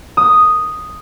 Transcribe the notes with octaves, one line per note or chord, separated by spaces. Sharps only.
D#6